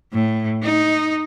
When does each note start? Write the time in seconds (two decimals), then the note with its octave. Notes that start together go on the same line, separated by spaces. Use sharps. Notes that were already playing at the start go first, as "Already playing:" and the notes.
0.13 A2
0.62 D#4